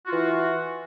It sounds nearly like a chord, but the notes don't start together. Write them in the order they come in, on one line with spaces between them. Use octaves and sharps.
F#4 F4 E3